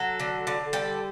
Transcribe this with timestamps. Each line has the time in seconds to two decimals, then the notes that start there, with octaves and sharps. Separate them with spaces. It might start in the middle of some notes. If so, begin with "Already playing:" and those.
Already playing: F#3 A4
0.20 D3
0.47 D3
0.73 G3 A4